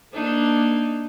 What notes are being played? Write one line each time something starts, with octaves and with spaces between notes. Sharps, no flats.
A#3 D4 D#4